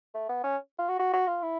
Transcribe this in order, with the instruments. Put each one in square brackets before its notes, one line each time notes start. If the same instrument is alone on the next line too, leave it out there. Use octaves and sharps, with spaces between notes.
[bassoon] A3
B3
C#4
F4
F#4
F#4
F#4
F4
E4